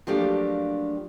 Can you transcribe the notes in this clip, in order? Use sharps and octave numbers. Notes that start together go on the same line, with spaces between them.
F3 F#3 A3 A#3 D4 G4